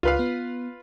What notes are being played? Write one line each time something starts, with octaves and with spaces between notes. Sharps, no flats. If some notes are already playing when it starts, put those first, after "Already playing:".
C#2 F4 B4 F5
B3